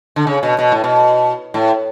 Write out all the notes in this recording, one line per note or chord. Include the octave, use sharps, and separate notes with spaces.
D3
C#3
B2
B2
A2
B2
A2